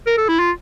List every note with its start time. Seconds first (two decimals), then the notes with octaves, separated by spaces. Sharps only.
0.07 A#4
0.18 A4
0.28 E4
0.39 F4